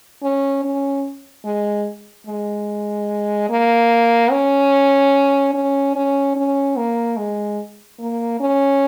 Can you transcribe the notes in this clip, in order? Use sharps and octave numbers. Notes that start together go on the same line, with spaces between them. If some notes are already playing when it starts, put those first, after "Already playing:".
C#4
C#4
G#3
G#3
A#3
C#4
C#4
C#4
C#4
A#3
G#3
A#3
C#4